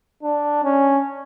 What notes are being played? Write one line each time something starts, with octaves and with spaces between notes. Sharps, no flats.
D4
C#4